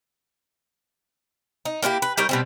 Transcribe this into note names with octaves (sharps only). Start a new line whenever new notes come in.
D#4
A#3 D4 E4 G4
B4
G3 D#4 A#4 C#5
B2 G3 C4